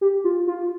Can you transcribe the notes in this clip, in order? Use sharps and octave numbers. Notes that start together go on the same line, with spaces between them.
G4
F4
F4